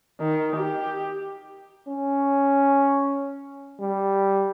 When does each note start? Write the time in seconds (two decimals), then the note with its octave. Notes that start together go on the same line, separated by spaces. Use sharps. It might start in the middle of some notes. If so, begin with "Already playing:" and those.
0.20 D#3
0.56 G4
1.88 C#4
3.80 G3